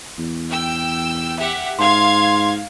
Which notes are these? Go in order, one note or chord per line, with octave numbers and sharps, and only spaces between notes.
E2
G5 E6
G4 E5 F#5
G#2 F5 C6 G#6